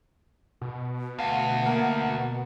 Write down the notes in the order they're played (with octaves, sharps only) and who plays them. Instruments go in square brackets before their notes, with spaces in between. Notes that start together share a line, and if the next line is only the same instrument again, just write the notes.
[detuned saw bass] B2
[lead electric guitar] D2 [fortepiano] F5 [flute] F#5
[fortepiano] A#3